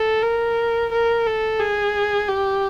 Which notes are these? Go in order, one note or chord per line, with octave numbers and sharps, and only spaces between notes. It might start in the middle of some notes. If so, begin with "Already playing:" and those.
Already playing: A4
A#4
A#4
A4
G#4
G4